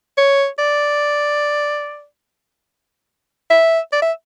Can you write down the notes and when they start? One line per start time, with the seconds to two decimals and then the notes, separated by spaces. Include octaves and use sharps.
0.18 C#5
0.59 D5
3.50 E5
3.92 D5
4.02 E5